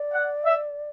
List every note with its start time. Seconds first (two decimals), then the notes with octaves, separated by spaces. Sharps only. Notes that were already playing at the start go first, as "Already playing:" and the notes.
Already playing: D5
0.13 F#5
0.43 E5